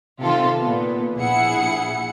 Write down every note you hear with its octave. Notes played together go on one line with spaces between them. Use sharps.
C3 D#3 F4 A4
A#2 B3
A#1 E4 G#4 F#5 C#7